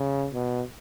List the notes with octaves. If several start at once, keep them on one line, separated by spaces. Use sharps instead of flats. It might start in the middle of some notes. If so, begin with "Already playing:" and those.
Already playing: C#3
B2